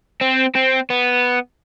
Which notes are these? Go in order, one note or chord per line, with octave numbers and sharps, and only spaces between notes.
C4
C4
B3